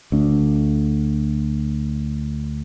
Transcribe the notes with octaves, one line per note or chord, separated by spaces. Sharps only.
D2 D4